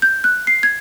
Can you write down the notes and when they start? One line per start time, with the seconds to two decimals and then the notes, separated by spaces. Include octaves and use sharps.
0.02 G6
0.24 F#6
0.47 C7
0.63 G#6